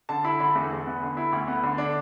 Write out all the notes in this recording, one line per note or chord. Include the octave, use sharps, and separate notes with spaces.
D3 A5
E4 B5
D3 B5
E2
E2
B3
D3
E4
D2
B3
D3
D4